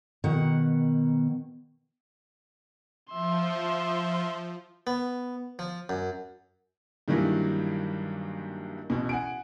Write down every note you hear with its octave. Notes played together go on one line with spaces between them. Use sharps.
B2 D#3 F#5
F3 E5 C6
B3
F3
F#2
G2 D#3 E3 F#3 G3 A#3
A1 B2
F#5 G#5 D7